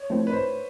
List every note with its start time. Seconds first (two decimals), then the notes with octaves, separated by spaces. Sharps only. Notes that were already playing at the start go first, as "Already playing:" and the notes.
Already playing: C#5
0.10 F3 A3 C4 E4
0.27 B4
0.33 A2 C5